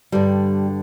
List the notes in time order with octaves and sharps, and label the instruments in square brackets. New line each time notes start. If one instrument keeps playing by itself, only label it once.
[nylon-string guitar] G2 D3 G3